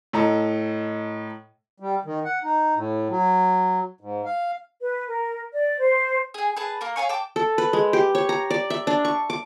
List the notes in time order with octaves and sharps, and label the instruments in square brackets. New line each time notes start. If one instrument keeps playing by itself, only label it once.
[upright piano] A2 A4 D#5 A#5
[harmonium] G3
D#3
F#5
D#4
A2
F#3
G#2
F5
[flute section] B4
A#4
D5
C5
[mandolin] G#4 G#5
G#4 B4 A5
A#3 A#4
C#5 F5 G#5 C#6
G5 A5 D6
[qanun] A4
B4
G#3
G4
C#5
A#5
D5
E5
D4
C#6
D6